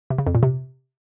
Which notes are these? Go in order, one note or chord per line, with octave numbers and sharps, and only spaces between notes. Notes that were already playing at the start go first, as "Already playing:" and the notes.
C3
C#3
F2
A#2
C3